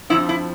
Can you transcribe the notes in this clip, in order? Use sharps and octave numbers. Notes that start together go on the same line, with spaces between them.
F2 C#3 F3 E4
E4